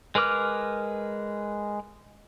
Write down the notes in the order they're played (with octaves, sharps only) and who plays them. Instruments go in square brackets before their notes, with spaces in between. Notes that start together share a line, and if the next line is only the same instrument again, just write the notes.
[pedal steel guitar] G#3 A#4 B4 D6 F6